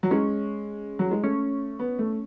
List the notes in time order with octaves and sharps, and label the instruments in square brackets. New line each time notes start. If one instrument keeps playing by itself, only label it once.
[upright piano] F#3
[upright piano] G#3 [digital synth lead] C#4
[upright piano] F#3
G#3
[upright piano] A3 [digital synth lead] C#4
[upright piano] B3
A3